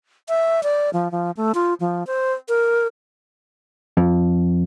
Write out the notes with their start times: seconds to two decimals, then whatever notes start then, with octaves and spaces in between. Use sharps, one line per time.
0.29 E5
0.63 D5
0.93 F3
1.11 F3
1.37 A3
1.55 F4
1.80 F3
2.07 C5
2.49 A#4
3.97 F2